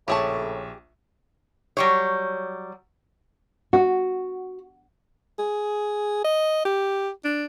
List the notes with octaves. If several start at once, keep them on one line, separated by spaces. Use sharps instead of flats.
A#1 A2 C#3 G4 G#4 E5 A5 C#6
F#3 G3 C#5
F#4
G#4
D#5
G4
D4